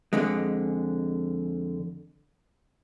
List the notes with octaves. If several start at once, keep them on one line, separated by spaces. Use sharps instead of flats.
F2 D3 G#3